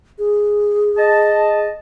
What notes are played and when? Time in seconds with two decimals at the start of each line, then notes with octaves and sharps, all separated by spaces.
0.19 G#4
0.98 D#5 A5